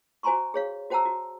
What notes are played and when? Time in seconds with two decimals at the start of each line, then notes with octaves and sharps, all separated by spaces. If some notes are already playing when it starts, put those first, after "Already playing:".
0.23 F#4 C5 G#5 A#5 C6 C#6
0.54 G#4 C#5 F5
0.90 F#4 C5 F#5 A5 A#5 E6
1.05 F#4